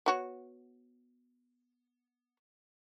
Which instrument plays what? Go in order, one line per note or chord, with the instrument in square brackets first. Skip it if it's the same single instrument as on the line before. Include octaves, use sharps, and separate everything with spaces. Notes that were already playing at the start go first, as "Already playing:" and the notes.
[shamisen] B3 F#4 C#5